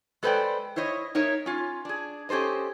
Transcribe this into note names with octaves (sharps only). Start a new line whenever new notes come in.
G#3 A4 B4 C5 D5 G5
E4 C5 C#5 D#5
D#4 A#4 C#5 E5
C#4 F4
D4 G#4
C#4 G4 A4 C5 D#5